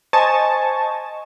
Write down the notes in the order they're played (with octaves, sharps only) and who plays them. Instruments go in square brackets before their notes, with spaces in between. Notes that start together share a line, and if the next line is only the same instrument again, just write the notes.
[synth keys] C5 D#5 G#5 A5 C#6